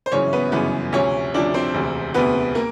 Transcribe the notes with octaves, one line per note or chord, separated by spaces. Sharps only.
C5
G1 F#2 C#3 E3 C#4 C#5
B3 B4
G1 F#2 C#3 E3 B3 B4
D2 C3 F3 C#4 C#5
D2 C3 F3 D4 D5
C4 C5
E1 D2 C3
E1 D2 C3 B3 B4
A#3 A#4